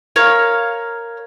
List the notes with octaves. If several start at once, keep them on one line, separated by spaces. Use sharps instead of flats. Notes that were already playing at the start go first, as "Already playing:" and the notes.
A#4 C#5 F5